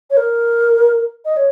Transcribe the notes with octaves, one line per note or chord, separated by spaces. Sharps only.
C#5
A#4
D#5
C#5